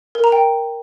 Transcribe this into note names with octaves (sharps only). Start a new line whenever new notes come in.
A#4
A#5
G5